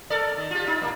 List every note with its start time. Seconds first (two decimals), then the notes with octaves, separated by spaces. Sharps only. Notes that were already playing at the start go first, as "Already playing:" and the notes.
0.10 A4 A#4 D5
0.37 D#3
0.51 F4 G4
0.67 D#4 F4
0.81 A2 F3 A#3